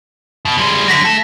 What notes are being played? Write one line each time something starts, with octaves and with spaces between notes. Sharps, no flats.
B2
G3 G#3
D3 F#3 A#6 B6
A3